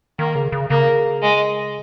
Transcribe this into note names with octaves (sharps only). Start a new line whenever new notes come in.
D#3 A#3
C#3
C#3
C#3 A#3
G#3